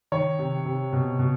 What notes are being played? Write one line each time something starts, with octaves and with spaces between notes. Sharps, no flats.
D#3 C#5
C3
C3
B2
B2